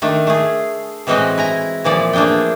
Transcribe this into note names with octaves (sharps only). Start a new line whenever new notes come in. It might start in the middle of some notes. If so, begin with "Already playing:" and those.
D#3 A3 D4
A3 G#4
A2 E3 G#3 C4 F#4 D#5
E4 G#5 A#5
A#2 E3 F3 D5
A3 A#3 D4 G#4 G5